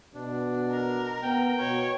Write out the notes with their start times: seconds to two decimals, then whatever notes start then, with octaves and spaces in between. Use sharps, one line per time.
0.15 B2 D4
0.72 A#4
1.23 B3 G5
1.60 B2 C#5